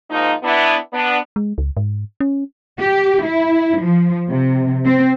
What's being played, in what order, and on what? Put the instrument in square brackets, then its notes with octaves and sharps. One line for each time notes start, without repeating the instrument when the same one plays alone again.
[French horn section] G#2 F3 A#3 D#4
B3 D4 E4
B3 D4
[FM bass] G#3
C#2
G#2
C#4
[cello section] G4
E4
F3
C3
C4